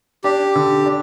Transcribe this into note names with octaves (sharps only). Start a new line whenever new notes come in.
D4 G4
D3
D4